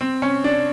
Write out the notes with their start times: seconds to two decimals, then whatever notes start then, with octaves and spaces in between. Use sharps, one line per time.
0.01 C4
0.22 C#4
0.44 D4